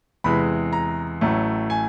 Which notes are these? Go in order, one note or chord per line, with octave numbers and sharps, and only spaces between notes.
E2 C3 E3 G#3 B5
A#5
A1 A2 F#3 A3
G#5